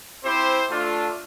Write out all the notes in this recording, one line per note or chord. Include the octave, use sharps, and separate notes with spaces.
C4 E4 G4 C5
A3 D4 F4